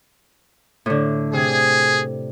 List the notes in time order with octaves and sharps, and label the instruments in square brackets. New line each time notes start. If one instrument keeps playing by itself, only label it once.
[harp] A2 D3
[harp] C3 [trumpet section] G#4